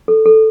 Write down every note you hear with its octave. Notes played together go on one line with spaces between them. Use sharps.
A4
A4